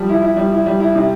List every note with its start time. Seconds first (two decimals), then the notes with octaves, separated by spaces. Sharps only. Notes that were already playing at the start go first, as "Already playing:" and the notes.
Already playing: F3 G3
0.09 E4
0.22 E4
0.37 G3
0.52 E4
0.66 G3
0.80 E4
0.95 C3